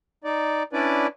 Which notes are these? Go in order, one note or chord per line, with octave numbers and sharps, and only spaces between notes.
D#4 D5
C#4 D4 E4 B4 D5